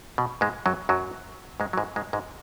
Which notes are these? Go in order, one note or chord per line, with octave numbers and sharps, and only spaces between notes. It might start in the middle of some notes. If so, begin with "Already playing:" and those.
B2
G#2 G#3
F#2 F#3
F#2 F#3
G#2 G#3
F#3
G#2 G#3
G#2 G#3
G#2 G#3